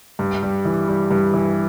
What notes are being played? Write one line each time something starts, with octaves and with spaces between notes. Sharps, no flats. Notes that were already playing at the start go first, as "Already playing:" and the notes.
G2
G3
E3
G3
G2
E3